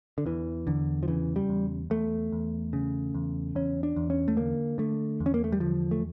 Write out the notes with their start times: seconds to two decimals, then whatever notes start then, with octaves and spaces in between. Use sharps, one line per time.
0.18 D3
0.26 E2 E3
0.67 E2 D3
1.03 F3
1.08 C#3 E3
1.36 G3
1.49 E2
1.90 E2 A3
2.32 E2
2.73 C#3
3.15 E2
3.55 E2 C#4
3.83 D4
3.96 E2
4.10 C#4
4.28 A3
4.37 D3 A#3
4.78 D3 A3
5.20 E2
5.26 C#4
5.34 A#3
5.44 A3
5.52 G3
5.60 D3 F3
5.91 A3